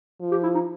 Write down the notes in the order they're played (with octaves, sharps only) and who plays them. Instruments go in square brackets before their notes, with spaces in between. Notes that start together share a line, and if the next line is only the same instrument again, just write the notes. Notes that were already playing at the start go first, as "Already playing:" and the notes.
[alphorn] F3
[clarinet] G4
E4
D#4